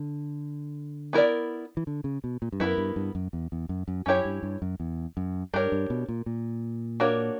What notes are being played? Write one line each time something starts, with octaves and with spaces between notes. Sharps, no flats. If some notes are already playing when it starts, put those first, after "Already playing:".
Already playing: D3
B3 E4 A#4 D5
E3
D3
C#3
B2
A#2
G2
F#2 B3 E4 A#4
G2
G2
F#2
E2
E2
F#2
F#2
F#2 C#4 E4 G4 C#5
G2
G2
F#2
E2
F#2
G2 D4 G4 A#4 C#5
G2
B2
A#2
A#2
A#3 D4 F#4 A#4 C#5